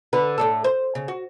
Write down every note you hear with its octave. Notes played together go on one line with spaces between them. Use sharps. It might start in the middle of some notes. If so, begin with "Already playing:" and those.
D3 B4
A2 D4 A4
C5
C#3
F#4